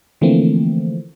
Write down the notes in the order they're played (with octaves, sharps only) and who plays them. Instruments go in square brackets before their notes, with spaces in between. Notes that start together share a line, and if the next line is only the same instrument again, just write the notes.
[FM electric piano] D3 E3 F3 A3 A#3 C4